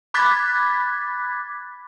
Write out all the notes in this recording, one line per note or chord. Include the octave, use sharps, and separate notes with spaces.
B5 D6 F#6 G#6 A6 B6